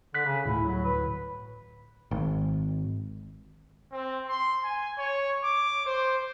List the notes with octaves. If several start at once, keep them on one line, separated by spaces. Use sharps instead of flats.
D3 F#6 B6
C#3
G1 D2 A2 E4
F#3
B4
G#1
C4
C6
G#5
C#5
D6
C5